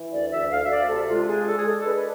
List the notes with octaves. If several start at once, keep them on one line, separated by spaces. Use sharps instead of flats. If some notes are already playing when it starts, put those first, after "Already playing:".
Already playing: E3
D2 D5
D2 E5
D2 F5
E5
D2 D5
C3 A4
G#3 F4
D4 G#4
D4 A4
G#4
G#3 A4
A4
D4 B4
B4